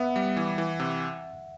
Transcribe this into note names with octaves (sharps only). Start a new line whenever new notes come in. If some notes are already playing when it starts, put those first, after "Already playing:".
Already playing: B3 E5 F#5
G3
E3
E3
C3